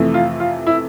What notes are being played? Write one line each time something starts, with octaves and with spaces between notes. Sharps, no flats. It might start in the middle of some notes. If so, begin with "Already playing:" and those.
Already playing: F2 C3 E3 A3
F4
F4
E4